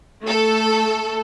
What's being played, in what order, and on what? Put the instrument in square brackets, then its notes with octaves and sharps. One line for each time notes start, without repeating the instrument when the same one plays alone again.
[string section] A3 A4